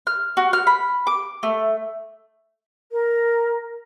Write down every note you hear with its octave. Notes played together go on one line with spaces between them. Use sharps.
F6
F#4
F6
B5
D6
A3
A#4